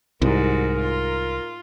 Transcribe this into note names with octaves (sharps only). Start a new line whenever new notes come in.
C2 G#2 F#4 A#4
F4